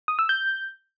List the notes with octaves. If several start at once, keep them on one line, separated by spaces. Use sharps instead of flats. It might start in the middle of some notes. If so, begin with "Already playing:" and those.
D#6
E6
G6